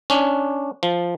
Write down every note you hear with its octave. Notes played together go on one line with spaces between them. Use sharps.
C#4 D4
F3